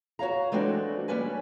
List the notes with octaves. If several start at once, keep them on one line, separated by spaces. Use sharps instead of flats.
F#4 C#5 F5 A#5
E3 G#3 A3 C4 D4 F#4
G3 A#3 C#4 D4 B4 G#5